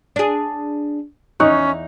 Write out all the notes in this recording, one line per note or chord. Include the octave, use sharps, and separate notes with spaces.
D4 G#4
E2 C#4 D#4 C#6 F#6